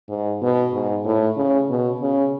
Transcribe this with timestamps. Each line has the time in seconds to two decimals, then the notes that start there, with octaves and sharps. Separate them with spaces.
0.09 G#2
0.41 B2
0.73 G#2
1.05 A2
1.36 C#3
1.69 B2
2.01 C#3